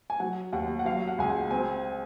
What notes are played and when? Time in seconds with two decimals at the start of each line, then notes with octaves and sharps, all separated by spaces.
0.10 G#5
0.20 F#3 F#5
0.52 D#2 F#5
0.79 F#5
0.86 F#3 F5
1.07 F#5
1.18 C#2 G#5
1.30 F#5
1.51 C4 G#5